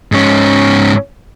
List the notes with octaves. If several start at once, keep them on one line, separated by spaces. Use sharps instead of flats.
G#2 C#4